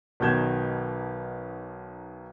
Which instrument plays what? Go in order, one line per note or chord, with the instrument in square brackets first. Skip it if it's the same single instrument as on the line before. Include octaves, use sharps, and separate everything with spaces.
[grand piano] B1 B2 D#3 G6 G#6 E7